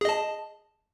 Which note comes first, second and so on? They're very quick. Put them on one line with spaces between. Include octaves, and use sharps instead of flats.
G#4 D#5 A5